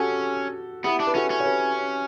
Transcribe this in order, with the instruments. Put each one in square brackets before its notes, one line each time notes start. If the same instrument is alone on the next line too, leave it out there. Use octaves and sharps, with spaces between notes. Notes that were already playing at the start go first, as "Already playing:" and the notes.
Already playing: [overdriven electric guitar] C#4 [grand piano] F#4 G4 A4
[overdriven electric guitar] B3 [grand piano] E4 G4
[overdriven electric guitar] D4
[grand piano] B4
[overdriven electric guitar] C#4 [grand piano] F#4 A4
[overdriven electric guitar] C#4
[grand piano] C#5
G4 B4